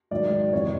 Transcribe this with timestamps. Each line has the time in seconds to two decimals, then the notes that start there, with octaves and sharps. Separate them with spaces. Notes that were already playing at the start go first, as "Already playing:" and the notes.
0.11 G#2 D#3 F#3 D5
0.53 F2 C3 E3 C#5